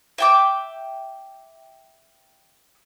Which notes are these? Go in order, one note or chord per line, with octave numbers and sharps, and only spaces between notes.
E5 G5 D6